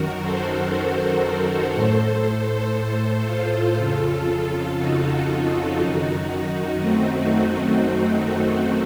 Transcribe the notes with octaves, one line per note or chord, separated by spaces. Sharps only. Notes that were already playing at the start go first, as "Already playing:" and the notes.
Already playing: F#2 D#3 F#4 A#4
A4 C5
A2
A4 C5
F4 A4
F2 C#3
F4 A4
D#4 F#4
F#2 D#3 D#4 F#4
A3 C4